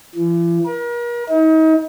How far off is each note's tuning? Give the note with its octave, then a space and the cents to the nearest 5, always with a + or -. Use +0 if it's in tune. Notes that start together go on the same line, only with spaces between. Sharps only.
E3 +45
A#4 +40
D#4 +35